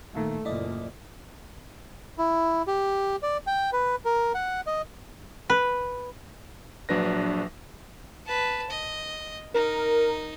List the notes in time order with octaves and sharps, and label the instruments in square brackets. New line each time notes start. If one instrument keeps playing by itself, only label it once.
[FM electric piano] A1 A#2 D#3 [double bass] A3
[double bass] F#1 A#2 [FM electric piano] E4 D5 D#5
[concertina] E4
G4
D5
G5
B4
A#4
F#5
D#5
[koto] B4
[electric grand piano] A#1 F#3 D4 B4 A#6
[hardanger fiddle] B4 A5
D#5
[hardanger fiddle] D#4 [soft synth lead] A#4